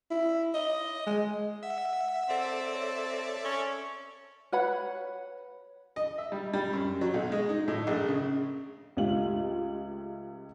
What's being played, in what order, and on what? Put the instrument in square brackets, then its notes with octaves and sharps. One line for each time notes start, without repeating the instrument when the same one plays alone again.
[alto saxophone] E4
D#5
G#3
[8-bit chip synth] E5 [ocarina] F#5
[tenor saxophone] C4 [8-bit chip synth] A4 D5 E5
[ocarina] C#5
[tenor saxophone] C#4
[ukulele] B4 C#5 F#5 B5
[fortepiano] D#5
E5
G3
G3
F#2
F#3
B1
G#3
D#4
A2
A#1
C#3
[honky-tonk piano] C#2 A3 F4 G4 F#7